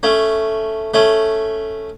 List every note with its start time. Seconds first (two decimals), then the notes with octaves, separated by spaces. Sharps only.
0.03 A3 C#4
0.94 A3 C#4